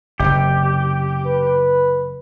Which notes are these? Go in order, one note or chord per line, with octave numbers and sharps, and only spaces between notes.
F#1 C3 G4
B4